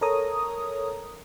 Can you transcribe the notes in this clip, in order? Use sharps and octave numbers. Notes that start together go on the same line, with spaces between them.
A4 A#4 C#5 A#5 D#6